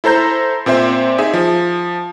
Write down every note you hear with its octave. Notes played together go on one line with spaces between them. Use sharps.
E4 A4 C5 A#5 G6
A#2 C4 C5 E5
D#4 G#4 E5
F3